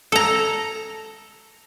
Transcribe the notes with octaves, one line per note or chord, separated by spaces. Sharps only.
A4 A#5